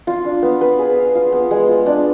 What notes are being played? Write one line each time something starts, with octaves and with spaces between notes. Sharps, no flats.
F4
D4
B3
B4
G#4
F5
F4
B3
G#3
F4
D4